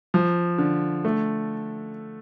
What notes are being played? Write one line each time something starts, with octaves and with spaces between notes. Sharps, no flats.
F3
D3
A3